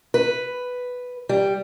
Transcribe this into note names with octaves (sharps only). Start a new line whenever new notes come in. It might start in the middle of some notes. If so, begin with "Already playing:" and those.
B4
G3